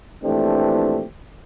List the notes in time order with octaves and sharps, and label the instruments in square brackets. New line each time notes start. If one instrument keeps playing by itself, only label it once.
[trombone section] A#1 E3 A3 C4 D4 G4